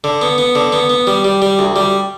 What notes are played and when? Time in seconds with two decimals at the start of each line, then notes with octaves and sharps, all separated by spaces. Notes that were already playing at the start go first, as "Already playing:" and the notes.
0.04 D3
0.21 B3
0.38 B3
0.55 D3
0.72 B3
0.90 B3
1.07 G3
1.24 G3
1.42 G3
1.59 D2
1.76 G3